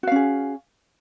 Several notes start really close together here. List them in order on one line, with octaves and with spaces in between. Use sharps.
F#4 F5 C#4 G#4